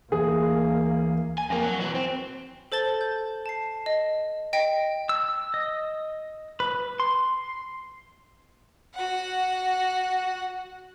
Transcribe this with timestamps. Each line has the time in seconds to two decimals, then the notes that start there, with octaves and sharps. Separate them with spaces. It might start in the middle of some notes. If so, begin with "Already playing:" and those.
0.12 D2 E3 A#3 G#4
1.38 G#5
1.50 F2 A#3
1.63 F#3
1.81 E3 F#4
1.95 C4
2.72 A4 C5 A5 A6 G7
3.01 G6
3.46 A5 C7
3.86 D#5
4.53 D#5 G5 A#6 B6 D7
5.09 E6
5.54 D#5
6.60 B4
7.00 C6
8.95 F#4 F#5